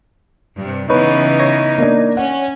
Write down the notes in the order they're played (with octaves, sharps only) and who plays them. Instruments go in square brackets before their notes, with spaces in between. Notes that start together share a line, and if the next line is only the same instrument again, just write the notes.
[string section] G2 C3
[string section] C#3 E3 B3 [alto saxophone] D#4 [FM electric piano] B4 C#5
[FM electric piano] C#5 G#6 A#6
[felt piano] A#3 D4
[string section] C#4 [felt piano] F#5